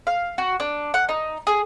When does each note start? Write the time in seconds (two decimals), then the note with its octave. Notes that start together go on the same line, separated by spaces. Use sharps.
0.07 F5
0.38 F#4
0.60 D4
0.94 F#5
1.09 D#4
1.47 G#4